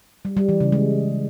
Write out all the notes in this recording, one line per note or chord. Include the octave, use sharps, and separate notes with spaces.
G3
G3
E3
C#3
G#3